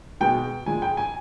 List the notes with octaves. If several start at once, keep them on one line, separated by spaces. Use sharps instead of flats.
B2 G#3 G5
A#2 G#3 G#5
G5
G#5